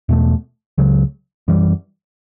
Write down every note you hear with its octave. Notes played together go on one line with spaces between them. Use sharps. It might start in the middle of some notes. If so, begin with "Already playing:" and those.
E2 B2 A3
C#2 C#3 F#3
F#2 E3 G3